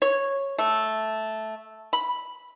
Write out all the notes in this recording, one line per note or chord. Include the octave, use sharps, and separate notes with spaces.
C#5
A3
B5